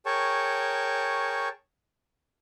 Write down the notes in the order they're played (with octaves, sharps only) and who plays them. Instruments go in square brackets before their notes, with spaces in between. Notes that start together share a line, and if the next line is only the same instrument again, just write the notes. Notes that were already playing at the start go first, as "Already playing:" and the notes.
[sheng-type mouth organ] G#4 A#4 C#5 G5 A5 C#6